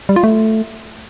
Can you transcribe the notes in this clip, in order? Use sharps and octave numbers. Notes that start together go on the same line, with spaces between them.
G3
F4
A3